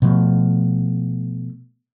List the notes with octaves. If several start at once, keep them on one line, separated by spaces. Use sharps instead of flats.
B2 F3 A3